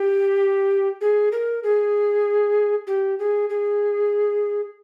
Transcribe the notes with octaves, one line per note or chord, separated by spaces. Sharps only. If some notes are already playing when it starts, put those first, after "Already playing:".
Already playing: G4
G#4
A#4
G#4
G4
G#4
G#4